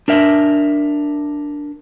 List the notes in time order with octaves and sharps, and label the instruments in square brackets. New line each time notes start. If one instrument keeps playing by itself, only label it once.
[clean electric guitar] D4 A#4 E5